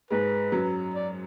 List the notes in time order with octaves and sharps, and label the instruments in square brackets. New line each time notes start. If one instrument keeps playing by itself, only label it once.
[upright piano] G#2 G#3 [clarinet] B4
[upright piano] F#2 F#3
[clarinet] D5